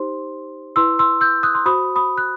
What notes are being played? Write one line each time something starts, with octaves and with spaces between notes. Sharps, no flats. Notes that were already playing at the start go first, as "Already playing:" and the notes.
Already playing: D#4 G4 C5 C6
E4 B4 C6 E6
C6 E6
E6 G6
D#6 F#6
C6
F#4 C5 B5 D#6
B5 D#6
F#6